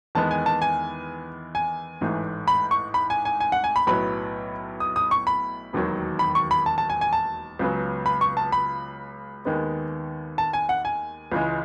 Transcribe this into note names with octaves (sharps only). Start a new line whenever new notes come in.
E2 D#3 G#3 B3 A5
G#5
A5
G#5
G#5
A1 G#2 E3 A3
B5
C#6
B5
G#5
G#5
G#5
F#5
G#5
B5
B1 A2 F#3 B3 B5
D#6
D#6
C#6
B5
E1 D#2 D#3 F#3
B5
C#6
B5
A5
A5
G#5
G#5
A5
C#2 C#3 F#3 B3
B5
C#6
A5
B5
D#2 D#3 G#3 B3
A5
G#5
F#5
G#5
C#2 C#3 E3 G#3